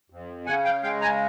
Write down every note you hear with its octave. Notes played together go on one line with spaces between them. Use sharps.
F2
C#3 F#5 G#5
F5 G5
G#3 F5 G5
G#5 A#5